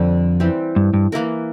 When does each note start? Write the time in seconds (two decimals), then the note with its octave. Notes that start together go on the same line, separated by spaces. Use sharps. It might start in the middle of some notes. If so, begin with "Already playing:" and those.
Already playing: F2 D3 G3 C4
0.40 E3 G3 C4 G4
0.76 G2
0.94 G2
1.12 E3 A#3 E4 A#4